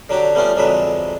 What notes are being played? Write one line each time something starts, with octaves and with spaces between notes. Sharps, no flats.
D3 F#3 D4 G4
G3 A3 B3 C#4 F4
F2 D3 F#3 G#3 B4 E5